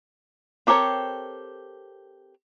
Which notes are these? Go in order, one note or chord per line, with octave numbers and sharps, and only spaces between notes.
C4 G4 A4 A#4 C#5